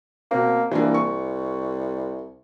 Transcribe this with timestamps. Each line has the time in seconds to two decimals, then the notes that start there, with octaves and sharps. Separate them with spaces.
0.31 B2 A#3 C4
0.71 C2 E3 A#3 D4
0.94 C#6